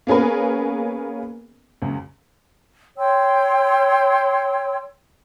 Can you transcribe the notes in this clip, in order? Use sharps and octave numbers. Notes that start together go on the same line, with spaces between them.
A#3 B3 C#4 G#4 A#4 B4
C#2 F#2
C#5 G5 C6 E6